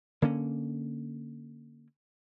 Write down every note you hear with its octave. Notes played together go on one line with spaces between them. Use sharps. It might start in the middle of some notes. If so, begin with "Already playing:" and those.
D3 A#3 C#4